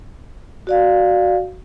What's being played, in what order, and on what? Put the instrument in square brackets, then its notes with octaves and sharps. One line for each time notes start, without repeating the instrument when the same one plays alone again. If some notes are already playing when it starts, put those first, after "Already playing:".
[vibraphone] F#4 D5 F5